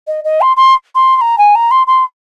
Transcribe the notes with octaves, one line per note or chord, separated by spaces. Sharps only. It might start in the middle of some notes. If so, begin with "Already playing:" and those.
D#5
D#5
C6
C6
C6
C6
A#5
G#5
A#5
C6
C6